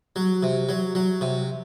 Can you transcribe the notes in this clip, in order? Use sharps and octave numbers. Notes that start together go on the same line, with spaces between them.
F#3
C3
F#3
F#3
C3